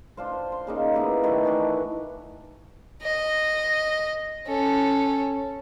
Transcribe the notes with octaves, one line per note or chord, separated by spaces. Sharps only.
D4 F4 C5
C6
C#3 A#3 D#4
B3 E4 G4 B4
D#3 A3 F#4 B4
D#3 E3 D4
D#5
C#4 A4